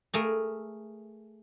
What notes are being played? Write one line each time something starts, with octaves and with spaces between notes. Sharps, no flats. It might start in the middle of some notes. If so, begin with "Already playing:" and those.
A3 G#4 A#4